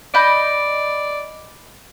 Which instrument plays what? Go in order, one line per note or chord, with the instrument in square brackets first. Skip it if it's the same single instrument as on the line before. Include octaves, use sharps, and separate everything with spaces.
[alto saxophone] D5 [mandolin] D#5 B5 G6